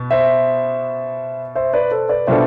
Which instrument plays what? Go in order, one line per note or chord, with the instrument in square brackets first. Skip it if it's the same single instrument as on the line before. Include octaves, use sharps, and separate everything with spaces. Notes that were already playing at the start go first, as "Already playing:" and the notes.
Already playing: [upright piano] B2 B3
[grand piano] C5 E5
C5 E5
B4 D5
A4 C5
B4 D5
[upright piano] B2 G3 D4 F4 A4 [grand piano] C5 E5